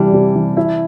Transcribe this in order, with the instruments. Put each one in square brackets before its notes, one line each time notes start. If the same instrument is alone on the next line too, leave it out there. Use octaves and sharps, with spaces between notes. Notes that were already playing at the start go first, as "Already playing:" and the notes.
Already playing: [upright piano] C3 E3 G3 [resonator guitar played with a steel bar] D4
[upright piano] C3
E3
E4